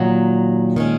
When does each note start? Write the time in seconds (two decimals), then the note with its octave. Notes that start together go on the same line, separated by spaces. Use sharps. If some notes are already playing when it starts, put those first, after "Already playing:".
Already playing: D#2 A#2 D#3 F#3
0.76 D#3 G#3 C#4